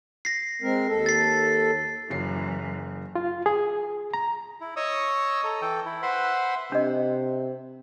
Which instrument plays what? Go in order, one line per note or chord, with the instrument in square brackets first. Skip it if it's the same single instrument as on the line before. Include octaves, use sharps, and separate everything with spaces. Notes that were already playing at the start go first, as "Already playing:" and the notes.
[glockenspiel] A#6 C7
[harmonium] G#3 C4 A#4
D#2 A4
[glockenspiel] A6 C7
[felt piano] F#1 F#3 C7 [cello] F#2 E3
[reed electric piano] F4
G#4
A#5
[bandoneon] E4
C#5 D#5 C#6 D#6 E6
A4 A#5
E3 A4 G5
E4
B4 C5 E5 F#5 B5 C6
[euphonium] C3 [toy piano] D4 D#5